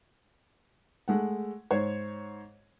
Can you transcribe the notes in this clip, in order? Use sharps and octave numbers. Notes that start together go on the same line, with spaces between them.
G#3 A3 F#5
G#2 C5 C#5 G#6